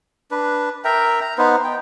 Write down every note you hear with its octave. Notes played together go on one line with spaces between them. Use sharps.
D4 B4
A#4 E5 G5 A#5
A#5
B3 D#4 B4 C5
G5